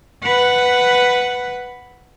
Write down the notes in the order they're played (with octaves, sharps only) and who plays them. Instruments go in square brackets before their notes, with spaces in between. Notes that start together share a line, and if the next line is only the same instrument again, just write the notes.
[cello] B4 F#5